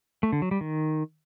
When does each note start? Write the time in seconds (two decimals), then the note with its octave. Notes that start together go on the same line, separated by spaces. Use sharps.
0.23 A3
0.32 D3
0.42 F#3
0.51 G3
0.61 D#3